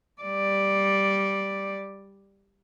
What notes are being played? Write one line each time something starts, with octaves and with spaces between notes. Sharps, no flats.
G3 D5